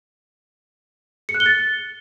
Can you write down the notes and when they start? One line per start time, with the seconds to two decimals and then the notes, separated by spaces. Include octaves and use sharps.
1.29 C#7
1.34 F#6
1.40 G7
1.46 A6